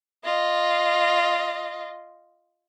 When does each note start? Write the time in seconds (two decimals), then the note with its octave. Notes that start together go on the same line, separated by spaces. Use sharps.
0.24 F4 D#5